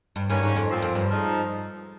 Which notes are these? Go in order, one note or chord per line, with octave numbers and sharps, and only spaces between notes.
G2
G2 D#3 A#3 C#4
G#2
F2
A#2 F3 C4
F2
G2
F3 G#3 D#4